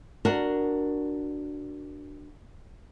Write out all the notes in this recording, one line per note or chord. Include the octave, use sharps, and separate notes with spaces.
D4 F#4 A#4